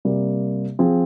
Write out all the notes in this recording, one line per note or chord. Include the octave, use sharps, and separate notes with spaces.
C3 G3 A#3
F3 C4 F4 G#4